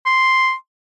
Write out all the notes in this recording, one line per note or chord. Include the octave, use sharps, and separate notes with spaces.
C6